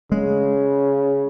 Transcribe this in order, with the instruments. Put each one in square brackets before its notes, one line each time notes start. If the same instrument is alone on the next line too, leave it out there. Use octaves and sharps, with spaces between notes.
[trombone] C#3 [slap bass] G#3